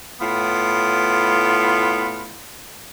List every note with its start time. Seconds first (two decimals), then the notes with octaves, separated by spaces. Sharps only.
0.19 A2 B3 F4